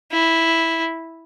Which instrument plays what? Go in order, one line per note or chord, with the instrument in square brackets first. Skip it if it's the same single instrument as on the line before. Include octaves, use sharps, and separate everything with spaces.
[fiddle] E4